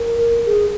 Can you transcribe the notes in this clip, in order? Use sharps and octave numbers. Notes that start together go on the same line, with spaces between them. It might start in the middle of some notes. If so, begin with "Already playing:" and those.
Already playing: A#4
G#4